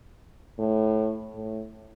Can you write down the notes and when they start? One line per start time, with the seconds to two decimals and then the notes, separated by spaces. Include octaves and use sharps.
0.59 A2
1.34 A2